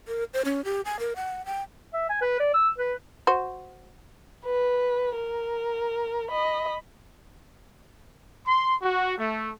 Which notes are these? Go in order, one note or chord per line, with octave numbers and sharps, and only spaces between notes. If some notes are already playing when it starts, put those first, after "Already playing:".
A#4
C5
C#4
G4
G#5
A#4
F#5
G5
E5
G#5
B4
D5
E6
B4
F#4 C5
B4
A#4
D#5 B5
C6
F#4
A3